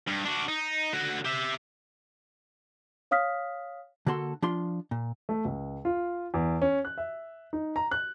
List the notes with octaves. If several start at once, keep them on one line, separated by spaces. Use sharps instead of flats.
G2
D4 F#4
D#4
D3 F#4
G4 E5
C#5 F5 D#6 F6 B6
D3 A#3 F#4 A4 C6
F3 D4 F4 C6
A#2
A3
C#2
F4
E2
C#4
F#6
E5
D#4
A#5
F#6